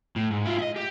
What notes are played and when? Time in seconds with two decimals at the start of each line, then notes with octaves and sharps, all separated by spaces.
0.16 A2
0.31 G#2
0.46 E4 F4
0.59 D#5 E5
0.76 G4